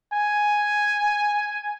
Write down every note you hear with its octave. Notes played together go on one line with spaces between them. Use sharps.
G#5